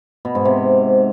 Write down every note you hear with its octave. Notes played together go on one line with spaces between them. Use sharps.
B2
G#2
C3